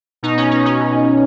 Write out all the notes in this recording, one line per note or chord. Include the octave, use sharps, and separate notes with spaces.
B2 D#4
C#4
D#4
C#4
B2